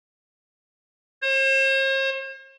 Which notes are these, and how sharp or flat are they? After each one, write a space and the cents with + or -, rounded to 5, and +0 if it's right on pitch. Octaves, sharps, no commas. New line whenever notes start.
C5 +45